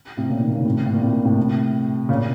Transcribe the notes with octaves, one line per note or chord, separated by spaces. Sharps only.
A2 C3
A#2 C#3
C3 D#3
A#2 C#3
A2 C3
A2
A#2
A2 C3
A#2
A2 C3
A#2 C#3